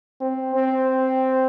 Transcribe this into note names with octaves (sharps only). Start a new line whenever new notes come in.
C4
C4